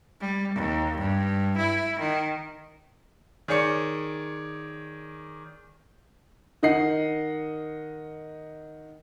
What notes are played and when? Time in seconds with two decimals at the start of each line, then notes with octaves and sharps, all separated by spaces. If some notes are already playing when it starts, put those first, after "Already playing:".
0.21 G3
0.55 D#2
0.98 G2
1.57 E4
2.00 D#3
3.48 D#3 G#4 C#5 D5 C#7
6.63 D#3 D#5 F#5 C7